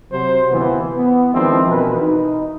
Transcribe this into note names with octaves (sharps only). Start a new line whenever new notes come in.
C3 F#3 C5
D2 C3 D#3 E3 A#3 B3
B3
D#3 F3 G#3 C4 D4 E4
B2 E3 A#4 B4
D#4